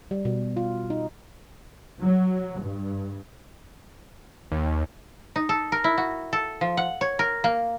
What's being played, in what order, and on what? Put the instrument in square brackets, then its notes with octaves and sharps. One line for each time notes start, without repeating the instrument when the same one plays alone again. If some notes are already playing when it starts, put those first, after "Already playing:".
[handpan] G3
B2
F4
D#4
[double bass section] F#3
G2
[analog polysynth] D#2
[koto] D#4
A4
A#4
E4
F#4
A4
F3
F#5
C#5
A#4
A#3